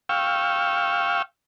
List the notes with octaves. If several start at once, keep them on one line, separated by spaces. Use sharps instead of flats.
F5 G5 C#6 E6